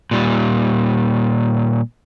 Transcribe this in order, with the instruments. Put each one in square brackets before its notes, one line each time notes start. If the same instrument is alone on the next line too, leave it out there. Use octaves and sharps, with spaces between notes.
[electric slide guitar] A#2 G3